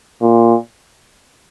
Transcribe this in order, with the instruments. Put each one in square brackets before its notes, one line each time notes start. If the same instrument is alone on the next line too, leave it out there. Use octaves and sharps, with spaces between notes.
[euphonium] A#2